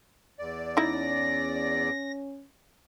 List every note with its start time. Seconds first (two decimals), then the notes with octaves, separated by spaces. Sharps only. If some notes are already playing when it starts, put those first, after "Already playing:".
0.39 E2 D5
0.77 C#4 D#4 E4 A#6